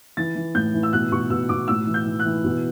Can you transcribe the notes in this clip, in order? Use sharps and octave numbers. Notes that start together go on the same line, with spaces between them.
E3 A6
E3
A2 G6
E3
E6
B2 F#6
B2 C#6
B2 E6
B2 D6
A2 E6
E3
G6
E3
F#6
E3
B2